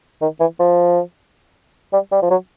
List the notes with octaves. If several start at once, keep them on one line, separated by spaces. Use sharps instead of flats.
D#3
E3
F3
G3
G3
F3
F#3